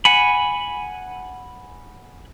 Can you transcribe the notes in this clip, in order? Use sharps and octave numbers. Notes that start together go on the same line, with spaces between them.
F#5 G#5 B5